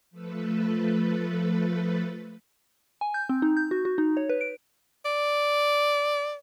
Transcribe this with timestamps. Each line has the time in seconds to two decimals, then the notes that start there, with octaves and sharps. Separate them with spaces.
0.11 F3 A3 A4 B4
3.01 G#5
3.14 G6
3.29 C4
3.42 D#4
3.57 G6
3.71 F#4
3.85 F#4
3.98 D#4
4.17 C#5
4.29 B4
4.41 D7
5.05 D5